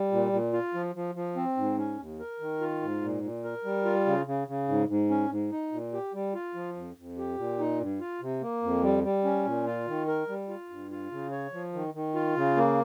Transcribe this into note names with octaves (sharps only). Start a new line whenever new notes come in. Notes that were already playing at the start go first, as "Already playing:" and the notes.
Already playing: G3
A#2
A#2
F4
F3
F3
F3
C4
G#2
C#4
D#2
A#4
D#3
F4
G#2
A#2
A#2
A#4
G3
F4
C#3
C#3
C#3
G#2
G#2
C#4
G#2
D#4
A#2
G4
G3
F4
F3
F2
F2
G4
A#2
D#4
G2
F4
C3
A#3
F2
G3
G3
C#4
A#2
F4
D#3
A#4
G3
F4
G2
F4
C#3
C#5
F3
D#3
D#3
F4
C#3
A#3